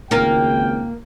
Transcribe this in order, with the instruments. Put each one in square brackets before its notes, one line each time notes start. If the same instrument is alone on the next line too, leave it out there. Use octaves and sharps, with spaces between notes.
[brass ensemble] G#1 C#2 G5 [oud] A#3 F4 A#4